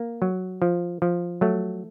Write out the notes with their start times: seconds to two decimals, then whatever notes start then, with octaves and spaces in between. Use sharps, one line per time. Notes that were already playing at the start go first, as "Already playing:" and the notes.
Already playing: A#3
0.22 F#3
0.62 F3
1.02 F3
1.41 F#3 A3